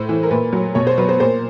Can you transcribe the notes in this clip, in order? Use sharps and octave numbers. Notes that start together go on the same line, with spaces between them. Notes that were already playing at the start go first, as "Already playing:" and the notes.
Already playing: A2 C5
E3
A#4
A#2 B4
F#3
B2 C#5
C5
F#3 B4
C5
A#2 C5